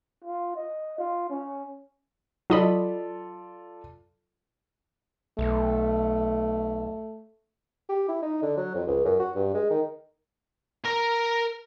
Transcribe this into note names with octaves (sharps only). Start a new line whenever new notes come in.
F4
D#5
F4
C#4
F#3 F4 A4 D5 D#5 B5
B1 A3
G4
E4
D#4
D3
F#3
F2
C#2
F#2
F#4
G2
G#3
D#3
A#4 A#5